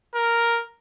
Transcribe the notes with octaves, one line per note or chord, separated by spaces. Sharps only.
A#4